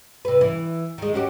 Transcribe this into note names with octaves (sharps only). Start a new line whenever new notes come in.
C3 B4
E3 E4
D#3 G#3
C#4 F#4 G4